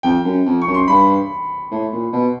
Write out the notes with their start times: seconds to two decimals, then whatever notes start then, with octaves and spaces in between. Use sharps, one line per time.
0.03 F2 G5
0.24 F#2
0.46 F2
0.62 C#6
0.67 F#2
0.74 C6
0.88 G2 B5
1.71 A2
1.92 A#2
2.13 B2